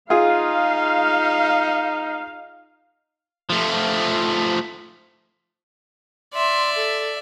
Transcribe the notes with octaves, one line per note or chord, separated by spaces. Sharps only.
D#4 F4 G#4 F5
F3 A3
D5 E5 C6
A4